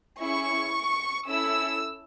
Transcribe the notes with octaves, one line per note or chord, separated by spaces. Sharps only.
C#4 E4 G#4 C#6
C#4 E4 A4 E6